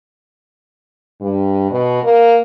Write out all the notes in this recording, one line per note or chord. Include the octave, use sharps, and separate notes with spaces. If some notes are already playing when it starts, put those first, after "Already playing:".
G2
B2
A#3